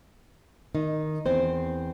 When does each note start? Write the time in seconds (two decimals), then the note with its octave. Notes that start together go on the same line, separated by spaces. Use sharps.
0.75 D#3 D#4
1.26 E2 C4 C5